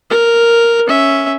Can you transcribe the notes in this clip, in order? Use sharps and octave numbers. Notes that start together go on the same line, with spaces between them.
A#4
C#4 E5